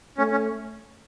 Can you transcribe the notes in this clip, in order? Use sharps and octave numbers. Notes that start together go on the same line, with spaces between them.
A3 C#4
C#4